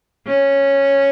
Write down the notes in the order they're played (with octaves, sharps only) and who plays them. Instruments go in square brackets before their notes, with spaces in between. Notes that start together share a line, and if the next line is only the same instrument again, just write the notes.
[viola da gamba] C#4